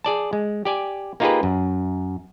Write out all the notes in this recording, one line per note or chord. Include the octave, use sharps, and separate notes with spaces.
G#4 D5 A5
G#3
G4 D5 G#5
A#3 D#4 F4 G4 G#4 B4
F#2